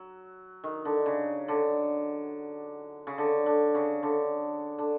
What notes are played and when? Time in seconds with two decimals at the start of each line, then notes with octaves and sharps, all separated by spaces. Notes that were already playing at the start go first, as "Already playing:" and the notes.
Already playing: F#3
0.64 D#3
0.85 D3
1.06 C#3
1.48 D3
3.07 C#3
3.18 D3
3.46 D3
3.75 C#3
4.03 D3
4.79 D3